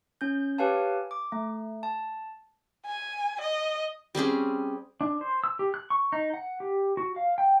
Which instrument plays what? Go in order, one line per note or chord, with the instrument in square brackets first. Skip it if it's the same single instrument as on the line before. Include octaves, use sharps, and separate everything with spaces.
[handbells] C#4 G6
G4 B4 C#5 F5 G#5 A5
D6
A3
A5
[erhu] G#5
D#5
[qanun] G3 C4 C#4 G#4
[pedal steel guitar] D4
C5
E6
G4
F#6
C#6
D#4
F#5
G4
F#4
F5
G5